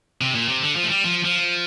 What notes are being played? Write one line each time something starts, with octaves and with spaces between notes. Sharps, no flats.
C3
A#2
C3
D3
F3
A3
G3
F3
F3